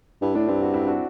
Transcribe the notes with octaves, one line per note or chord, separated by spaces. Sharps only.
G2 E4
A2 D4
G2 C4 E4
D4 F#4
C4 E4
D4 F#4